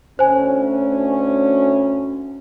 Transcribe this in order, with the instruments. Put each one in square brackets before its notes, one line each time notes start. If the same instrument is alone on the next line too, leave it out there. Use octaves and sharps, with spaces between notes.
[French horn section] D2 C#4 [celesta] C5 G#5